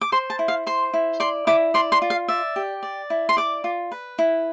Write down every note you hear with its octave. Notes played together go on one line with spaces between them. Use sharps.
D6
C5 C6
A5
E4
F5
C5 C6
E4
D5 C6
E4 D6
D5 C6
C6
F4
F5
D5 E5
G4
D5
E4
C6
D5 D6
F4
B4
E4